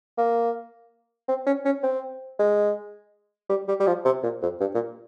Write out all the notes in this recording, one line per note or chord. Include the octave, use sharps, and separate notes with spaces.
A#3
C4
C#4
C#4
C4
G#3
G3
G3
G3
F3
C3
A#2
F2
G2
A#2